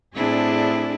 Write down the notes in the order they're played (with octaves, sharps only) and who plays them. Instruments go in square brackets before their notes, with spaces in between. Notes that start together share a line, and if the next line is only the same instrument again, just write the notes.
[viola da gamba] A2 C4 E4 [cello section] D4 G#4